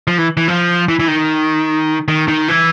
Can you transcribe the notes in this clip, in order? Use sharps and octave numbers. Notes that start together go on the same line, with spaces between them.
F3
E3
E3
F3
E3
E3
D#3
D#3
D#3
E3